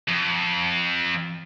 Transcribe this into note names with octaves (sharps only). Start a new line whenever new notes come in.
F2